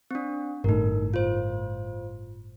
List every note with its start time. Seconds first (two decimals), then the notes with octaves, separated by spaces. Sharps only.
0.11 C4 D4
0.64 G1 A2 D#4 A#4
1.14 F4 C5